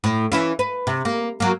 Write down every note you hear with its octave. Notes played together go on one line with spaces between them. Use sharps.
A2
E3 C#4 E4
B4
C3
A#3
F#3 A#3